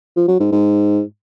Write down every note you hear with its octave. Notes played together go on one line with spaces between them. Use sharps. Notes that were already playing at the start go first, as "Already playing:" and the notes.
F3
F#3
G#2
G#2